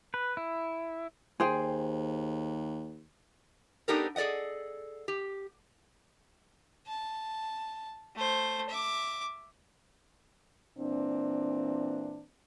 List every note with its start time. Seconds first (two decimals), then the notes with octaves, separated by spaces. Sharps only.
0.14 B4
0.37 E4
1.40 D#2 G#4 C5 G5
3.88 B3 D4 D#4 G4 A4 A#4
4.16 G#4 A4 D5 D#5 F#5
5.08 G4
6.87 A5
8.16 A3 C5
8.69 E5 D6
10.78 A#2 E3 C4 D4